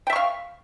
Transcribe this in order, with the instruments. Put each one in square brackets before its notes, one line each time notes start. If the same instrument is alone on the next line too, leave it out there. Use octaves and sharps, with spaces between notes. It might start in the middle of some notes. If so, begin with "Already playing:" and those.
[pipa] G5
E5
C#6
F5